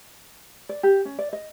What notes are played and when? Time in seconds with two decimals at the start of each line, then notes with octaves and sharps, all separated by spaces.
0.69 D5
0.83 G4
1.05 C#4
1.18 D5
1.33 D#5